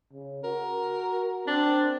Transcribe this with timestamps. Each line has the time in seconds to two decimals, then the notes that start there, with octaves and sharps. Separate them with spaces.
0.13 C#3
0.44 F#4 A#4
1.47 C4 D4